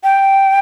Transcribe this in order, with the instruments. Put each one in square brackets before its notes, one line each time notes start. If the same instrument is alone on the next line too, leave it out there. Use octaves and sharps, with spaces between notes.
[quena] G5